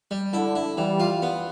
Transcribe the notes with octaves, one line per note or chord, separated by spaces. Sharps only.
G3
D3 E4
E4
E3 G3
F4
B3